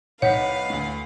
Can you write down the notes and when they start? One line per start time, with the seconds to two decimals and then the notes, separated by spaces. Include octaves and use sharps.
0.22 C2 D#4 B4 C#5 F5 F#5 B6
0.70 D2 A2